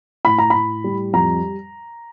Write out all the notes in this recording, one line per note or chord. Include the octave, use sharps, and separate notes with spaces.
A2 B5
A#5
A2 B5
G3
F2 A#5